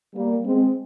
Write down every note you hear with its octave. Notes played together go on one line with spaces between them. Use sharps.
G3 A#3
G#3 C4